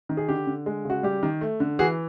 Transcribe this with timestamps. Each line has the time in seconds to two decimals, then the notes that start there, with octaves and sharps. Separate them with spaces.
0.09 D#3
0.17 G#4
0.28 D3 G4
0.47 D3
0.66 G#3
0.85 C#3 F#4
1.03 G3 G4
1.23 D#3
1.41 A3
1.60 D3
1.79 E3 F#4 G#4